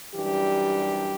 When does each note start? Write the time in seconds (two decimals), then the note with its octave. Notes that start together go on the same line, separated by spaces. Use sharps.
0.15 F#2 E3 G3 D4 G4